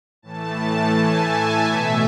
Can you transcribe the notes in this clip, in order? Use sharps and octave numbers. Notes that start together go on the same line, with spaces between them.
A2 E3 A3 A5
G#5
E5
B2 A3 E5